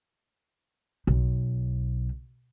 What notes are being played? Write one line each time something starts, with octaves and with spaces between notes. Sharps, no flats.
B1